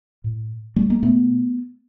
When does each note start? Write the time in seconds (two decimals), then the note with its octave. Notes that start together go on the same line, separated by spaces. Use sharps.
0.24 A2
0.76 G3 A3
0.90 G#3 A#3
1.03 B2 A3 B3